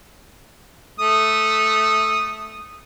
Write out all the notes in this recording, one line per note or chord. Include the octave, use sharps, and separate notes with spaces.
A3 D#6